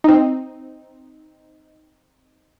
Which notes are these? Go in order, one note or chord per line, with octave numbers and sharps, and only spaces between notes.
C4 D#4